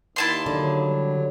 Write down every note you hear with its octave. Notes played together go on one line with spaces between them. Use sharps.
D#2 E4 A5 C6
D3 F#3
G3